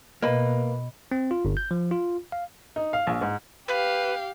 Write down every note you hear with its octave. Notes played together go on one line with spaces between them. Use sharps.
B2 A#3 B4 D#5 B5
C4
F4
G1
G6
F3
F4
F5
D#4
F5
A#1
G#2
G4 B4 F5